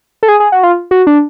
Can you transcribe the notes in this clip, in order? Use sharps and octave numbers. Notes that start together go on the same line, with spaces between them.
A4
G#4
G#4
F#4
F4
F#4
D4